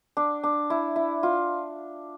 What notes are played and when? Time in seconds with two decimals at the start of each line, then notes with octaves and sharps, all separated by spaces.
0.17 D4
0.44 D4
0.70 E4
0.96 E4
1.23 F4